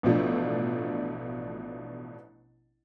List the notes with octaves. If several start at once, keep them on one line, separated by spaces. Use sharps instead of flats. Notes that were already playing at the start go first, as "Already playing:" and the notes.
A1 B2 F3 A3 D4